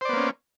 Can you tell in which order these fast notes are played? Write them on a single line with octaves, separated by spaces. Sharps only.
C5 D5 B3 A#3 C#4